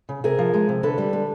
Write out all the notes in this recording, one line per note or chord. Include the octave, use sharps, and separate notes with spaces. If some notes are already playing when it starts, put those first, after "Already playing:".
C#3
C3 G#4 A#4
F3
G#3
C3
D3 A4 B4
G3
D3